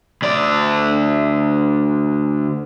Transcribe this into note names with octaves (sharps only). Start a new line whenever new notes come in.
D2 D5